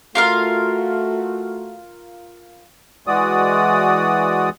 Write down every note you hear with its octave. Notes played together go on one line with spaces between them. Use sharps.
A3 F4 F#4 A#4 F5
E3 G#3 F#4 D5 D#6